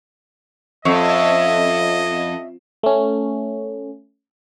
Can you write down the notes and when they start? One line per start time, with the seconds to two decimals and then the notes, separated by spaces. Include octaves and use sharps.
0.85 F2 C#4 D#5 E5
2.83 A3 C#4